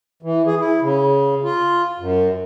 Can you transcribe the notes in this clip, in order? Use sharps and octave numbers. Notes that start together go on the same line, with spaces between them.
E3
G#4
E4
C#3
F4
F#2